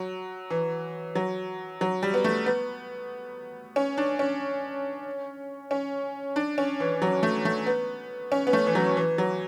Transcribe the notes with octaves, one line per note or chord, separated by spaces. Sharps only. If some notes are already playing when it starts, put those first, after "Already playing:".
Already playing: F#3
E3
F#3
F#3
G3
B3
A3
B3
C#4
D4
C#4
C#4
D4
C#4
E3
F#3
A3
A3
B3
C#4
B3
A3
E3
F#3
E3
F#3